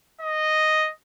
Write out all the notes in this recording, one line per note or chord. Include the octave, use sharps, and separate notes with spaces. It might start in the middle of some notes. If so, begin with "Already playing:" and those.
D#5